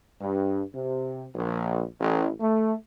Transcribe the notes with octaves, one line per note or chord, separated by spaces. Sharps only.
G2
C3
A#1
A1
A3